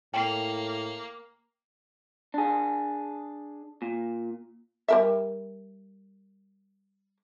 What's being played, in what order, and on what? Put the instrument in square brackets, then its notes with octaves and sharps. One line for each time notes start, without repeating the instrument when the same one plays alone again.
[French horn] A2 [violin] A#3 [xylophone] G5 C7
[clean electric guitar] D4 G#4
A#2
[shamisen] G3 A#4 E5